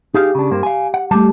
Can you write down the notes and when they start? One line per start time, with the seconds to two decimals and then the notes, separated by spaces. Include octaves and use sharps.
0.15 D#4 G4 G#4 F5
0.35 C#3 D4
0.51 G2 A#3 C4
0.63 F5 G#5
0.94 F#5
1.11 G3 A3 G4 A5